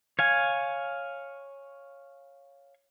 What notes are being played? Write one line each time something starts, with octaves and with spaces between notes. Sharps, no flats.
C#5 F5 G#5 G#6